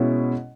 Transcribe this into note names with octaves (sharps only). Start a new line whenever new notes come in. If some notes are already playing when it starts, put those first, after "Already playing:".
Already playing: B2 G#3 C#4 E4